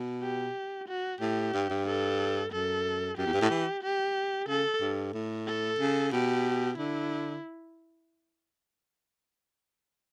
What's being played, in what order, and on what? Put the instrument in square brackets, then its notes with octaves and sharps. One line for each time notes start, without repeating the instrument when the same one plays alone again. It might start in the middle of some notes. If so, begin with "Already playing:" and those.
Already playing: [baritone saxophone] B2
[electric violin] G4
F#4
[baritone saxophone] A2 [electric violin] G4
[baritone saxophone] G2
G2
[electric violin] A4
[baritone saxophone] F#2 [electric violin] A4
[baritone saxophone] F#2 [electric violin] G4
[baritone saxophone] E2
G2
A2
E3
[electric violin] G4
[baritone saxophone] C#3 [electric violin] A4
[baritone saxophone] G2
A2
[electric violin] A4
[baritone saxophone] C#3
[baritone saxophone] B2 [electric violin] G4
[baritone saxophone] D3 [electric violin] E4